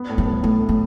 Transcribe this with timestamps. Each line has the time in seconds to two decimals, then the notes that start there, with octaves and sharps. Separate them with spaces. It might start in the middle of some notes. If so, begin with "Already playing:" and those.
Already playing: B3
0.10 A2
0.18 G3
0.26 B3
0.43 A2 A3
0.60 A2
0.69 A3